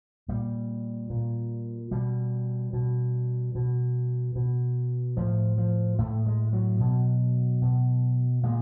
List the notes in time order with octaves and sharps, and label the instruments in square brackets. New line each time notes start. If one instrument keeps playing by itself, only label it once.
[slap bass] A#2 G3
A#2
B2 G3
B2
B2
B2
A2 F3
F3
A2 A3
G#3
F#3
B2
B2
A#2 G#3